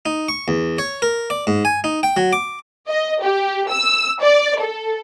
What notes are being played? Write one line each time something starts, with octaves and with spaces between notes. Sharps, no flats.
D#4
C#6
E2
C#5
A#4
D5
G#2
G#5
D#4
G5
F#3
D6
D#5
G4
E6
D5
A4